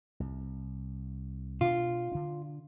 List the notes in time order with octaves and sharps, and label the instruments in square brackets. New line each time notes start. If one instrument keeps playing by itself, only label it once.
[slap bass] C2
[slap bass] B2 D4 [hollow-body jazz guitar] F4
[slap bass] D3 D4